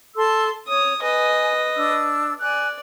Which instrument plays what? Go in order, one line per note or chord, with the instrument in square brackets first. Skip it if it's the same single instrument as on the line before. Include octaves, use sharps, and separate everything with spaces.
[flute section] A4 C6 E6
[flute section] C#5 [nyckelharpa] D#6
[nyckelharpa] B4 D#5 [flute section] G#5
[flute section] D4 E6
[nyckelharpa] D5 [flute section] G#5 F#6